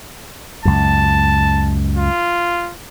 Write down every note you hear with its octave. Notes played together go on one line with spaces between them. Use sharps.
C#2 F#2 A5
F4